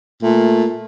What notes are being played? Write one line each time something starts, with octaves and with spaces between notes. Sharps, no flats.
A#2 A3